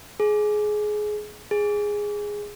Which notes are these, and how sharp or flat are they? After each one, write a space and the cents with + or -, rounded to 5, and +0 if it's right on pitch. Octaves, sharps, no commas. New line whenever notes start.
G#4 +20
G#4 -5